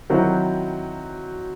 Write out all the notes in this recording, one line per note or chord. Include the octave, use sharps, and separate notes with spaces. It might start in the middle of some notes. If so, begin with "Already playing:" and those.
D#3 F#3 C4 E4 F#4